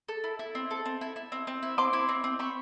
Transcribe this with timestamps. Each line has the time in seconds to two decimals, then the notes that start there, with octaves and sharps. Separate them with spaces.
0.08 A4
0.24 E4
0.39 E4
0.55 C4
0.71 A4
0.85 C4
1.01 E4
1.16 E4
1.32 C4
1.47 C4
1.63 E4
1.78 C4 C6 D6
1.93 E4
2.09 C4
2.24 C4
2.39 C4 B5 C#6